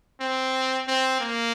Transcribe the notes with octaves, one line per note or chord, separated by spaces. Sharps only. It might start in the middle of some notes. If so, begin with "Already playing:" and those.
C4
C4
A#3